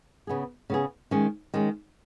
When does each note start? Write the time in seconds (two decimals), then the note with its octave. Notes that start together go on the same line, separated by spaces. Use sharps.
0.27 C#3 B3 G#4
0.70 C#3 B3 G#4
1.11 D#3 G#3 C#4
1.54 D#3 G#3 C#4